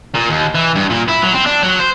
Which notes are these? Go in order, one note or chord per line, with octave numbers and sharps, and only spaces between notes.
A#2
D#2
E3
G2
A#2
E4
F#3
C4
D4
F#3
C5